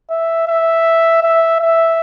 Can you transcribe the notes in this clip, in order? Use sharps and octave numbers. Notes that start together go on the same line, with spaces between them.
E5
E5
E5
E5